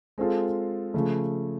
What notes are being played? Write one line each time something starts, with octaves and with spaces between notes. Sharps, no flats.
G#3 C4 F4 A4
C#3 F3 A3